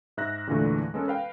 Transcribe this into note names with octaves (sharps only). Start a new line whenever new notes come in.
G#2 E5 F#6 A#6
E2 A#2 D3 E3 G#3 A3
G#3 B3 C#4 A4 A#4
B4 F5 G5